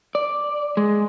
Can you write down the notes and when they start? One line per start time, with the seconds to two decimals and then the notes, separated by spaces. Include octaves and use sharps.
0.15 D5
0.77 G#3